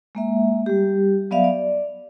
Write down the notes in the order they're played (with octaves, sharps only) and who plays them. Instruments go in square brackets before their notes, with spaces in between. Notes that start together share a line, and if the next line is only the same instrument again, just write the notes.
[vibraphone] G#3 A#3 E5
G3 G4
F#3 B3 D5 E5 F5
D5